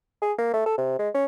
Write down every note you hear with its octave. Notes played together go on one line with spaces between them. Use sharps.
G#4
A#3
A3
A4
C3
G#3
C#4